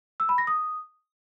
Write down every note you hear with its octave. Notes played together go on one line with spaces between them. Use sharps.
E6
B5
A#6
D#6